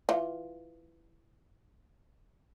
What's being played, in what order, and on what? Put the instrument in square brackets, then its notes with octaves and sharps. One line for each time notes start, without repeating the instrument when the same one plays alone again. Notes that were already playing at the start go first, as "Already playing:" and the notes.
[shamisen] E3 F4